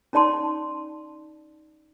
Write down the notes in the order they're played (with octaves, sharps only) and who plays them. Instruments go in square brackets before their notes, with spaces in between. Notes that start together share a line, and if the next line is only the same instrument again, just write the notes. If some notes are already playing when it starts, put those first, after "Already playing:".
[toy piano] C#4 D#4 D5 A5 C6